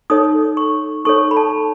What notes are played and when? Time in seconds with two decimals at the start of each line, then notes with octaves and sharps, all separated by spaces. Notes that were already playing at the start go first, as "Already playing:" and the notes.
0.10 D#4 A4 C#5 D#6
0.57 C#6
1.05 D#4 A4 C#5 C#6
1.31 B5
1.37 A5